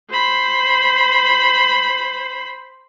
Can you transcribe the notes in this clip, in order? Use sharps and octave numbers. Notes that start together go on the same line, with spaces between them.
C5 B5